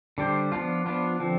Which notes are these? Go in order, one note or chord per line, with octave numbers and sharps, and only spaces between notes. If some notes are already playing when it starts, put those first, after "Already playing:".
D3 G3 D4 G4 C5
F3 B3 D4 F4
F3 B3 D4 F4
D3 F3 C4